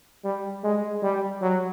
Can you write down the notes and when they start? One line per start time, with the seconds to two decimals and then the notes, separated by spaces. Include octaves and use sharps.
0.25 G3
0.64 G#3
1.03 G3
1.42 F#3